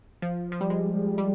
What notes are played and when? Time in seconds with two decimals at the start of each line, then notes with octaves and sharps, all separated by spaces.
0.22 F3
0.52 F3
0.61 G3
0.70 G#3
1.18 G3